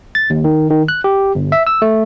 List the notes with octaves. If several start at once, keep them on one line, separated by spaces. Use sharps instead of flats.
A6
D#2
D#3
D#3
F#6
G4
G1
E5
E6
A3